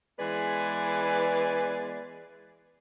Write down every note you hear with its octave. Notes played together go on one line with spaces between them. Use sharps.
E3 G#3 B3 G#4 B4 D5